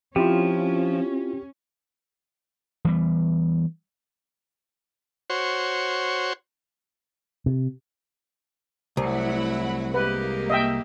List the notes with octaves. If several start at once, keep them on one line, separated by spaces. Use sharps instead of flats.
F3 C4 C#4 E4 F4 G4
E3 G3 B3
F#4 C5 C#5
C3
C2 F#3 A3 E4 F#5 B5
G#3 A#3 G4 B4
D#5 E5 G5